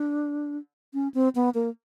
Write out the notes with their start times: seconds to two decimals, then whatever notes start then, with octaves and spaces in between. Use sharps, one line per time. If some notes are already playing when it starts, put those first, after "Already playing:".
Already playing: D4
0.94 C#4
1.14 C4
1.35 B3
1.55 A#3